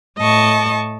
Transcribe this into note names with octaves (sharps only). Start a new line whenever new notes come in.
A2 D#5 A5 C#6